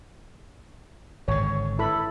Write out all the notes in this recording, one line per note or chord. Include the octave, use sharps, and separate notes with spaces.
G#1 D3 C#5
E4 A4 B5